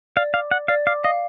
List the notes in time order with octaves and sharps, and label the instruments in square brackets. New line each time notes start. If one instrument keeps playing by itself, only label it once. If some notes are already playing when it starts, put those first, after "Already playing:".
[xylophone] D5 [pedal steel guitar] F5
[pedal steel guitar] F5 [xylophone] D6
[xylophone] D5 [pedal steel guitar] F#5
[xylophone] D5 [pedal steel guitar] F5
[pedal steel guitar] F5 [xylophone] D6
[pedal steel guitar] D#5 [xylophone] F5